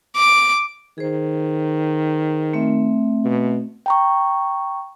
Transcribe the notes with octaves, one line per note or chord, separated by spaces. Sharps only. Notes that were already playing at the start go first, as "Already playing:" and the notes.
D6
D#3 G#4 C5
A3 C4 E5
B2
G5 A#5 C#6